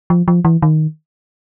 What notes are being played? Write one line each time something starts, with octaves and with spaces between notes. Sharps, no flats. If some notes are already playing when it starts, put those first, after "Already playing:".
F3
F3
E3
D#3